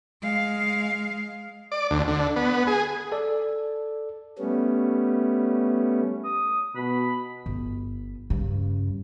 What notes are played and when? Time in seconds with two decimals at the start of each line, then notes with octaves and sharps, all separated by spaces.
0.22 G#3 F5
1.72 D5
1.91 D2
2.08 D3
2.36 B3
2.67 G#4
3.12 A4 D5
4.38 G3 A3 B3 C#4
6.25 D#6
6.76 B2 B5
7.46 G1
8.30 G2 C#3